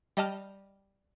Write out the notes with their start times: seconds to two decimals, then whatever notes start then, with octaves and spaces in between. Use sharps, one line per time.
0.17 G3 D#5 A5 F6